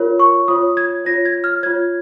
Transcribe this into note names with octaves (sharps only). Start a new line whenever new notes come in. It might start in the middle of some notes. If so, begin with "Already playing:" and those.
Already playing: F4 A#4 C#5
C#6
F4 C#5 D#6
G#6
F4 C#5 A#6
G#6
F6
F4 C#5 G#6